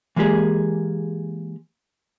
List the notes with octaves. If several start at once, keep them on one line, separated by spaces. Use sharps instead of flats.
E3 G#3 A#3 G4 G#4